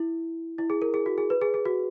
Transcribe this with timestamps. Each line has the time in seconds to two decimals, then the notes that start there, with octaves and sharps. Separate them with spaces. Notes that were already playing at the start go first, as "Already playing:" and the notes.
Already playing: E4
0.58 E4
0.70 G#4
0.82 A#4
0.94 G#4
1.06 F#4
1.18 G#4
1.30 B4
1.42 G#4
1.54 G#4
1.65 F#4